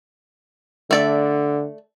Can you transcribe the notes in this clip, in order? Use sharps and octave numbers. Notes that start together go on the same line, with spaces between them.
D3 A3 D5 E5